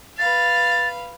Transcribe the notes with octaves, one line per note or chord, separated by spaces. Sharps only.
B4 F5 A6